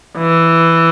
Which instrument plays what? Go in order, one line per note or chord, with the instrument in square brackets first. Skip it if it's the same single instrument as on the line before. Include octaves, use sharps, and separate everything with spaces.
[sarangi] E3